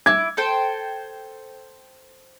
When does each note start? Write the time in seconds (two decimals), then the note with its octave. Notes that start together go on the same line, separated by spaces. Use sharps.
0.06 E4 D6 G#6
0.37 A4 C5 G5